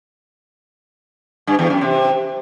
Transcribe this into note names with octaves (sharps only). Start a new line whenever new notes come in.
G2
E2
F#2
C3